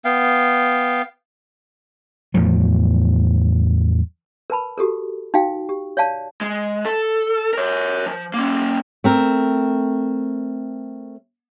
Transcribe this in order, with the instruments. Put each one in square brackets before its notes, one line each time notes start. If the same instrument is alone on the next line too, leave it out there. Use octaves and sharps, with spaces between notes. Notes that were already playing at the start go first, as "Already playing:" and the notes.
[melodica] B3 F5 G5
[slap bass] E2 A2 F3 F#3
[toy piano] A#4 B4 A5 B5
F#4 G4 A4 A#4
D#4 F#4 F5 G5
G4
C#5 D5 F5 A5
[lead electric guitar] G#3
A4
A#4 C#5
F3
A#3 C#4
[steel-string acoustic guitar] A3 C4 A#4